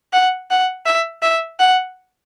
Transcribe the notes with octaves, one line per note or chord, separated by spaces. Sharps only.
F#5
F#5
E5
E5
F#5